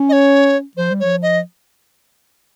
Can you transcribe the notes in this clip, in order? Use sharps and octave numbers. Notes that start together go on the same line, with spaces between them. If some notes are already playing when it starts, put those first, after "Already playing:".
Already playing: C#4
D#5
C#5
F3 C5
G3
F3 C#5
D#5